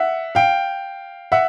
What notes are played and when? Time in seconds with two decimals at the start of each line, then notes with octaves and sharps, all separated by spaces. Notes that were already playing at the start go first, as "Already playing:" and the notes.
Already playing: E5 F#5
0.35 F5 G5
1.32 E5 F#5